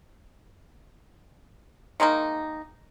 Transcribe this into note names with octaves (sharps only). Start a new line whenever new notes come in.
D#3 G#3 A#3 D#4